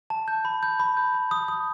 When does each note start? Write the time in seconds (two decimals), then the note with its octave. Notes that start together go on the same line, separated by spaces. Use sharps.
0.10 A5
0.28 G6
0.45 B5
0.63 G6
0.80 B5
0.97 G6
1.14 B5
1.31 D#6
1.48 D#6